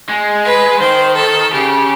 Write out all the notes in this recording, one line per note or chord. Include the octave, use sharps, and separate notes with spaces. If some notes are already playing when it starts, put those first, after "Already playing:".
G#3
B4
D#3 C5
A4
C#3 G4